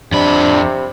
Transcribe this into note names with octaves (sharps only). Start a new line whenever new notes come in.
F2 C3 D4 B5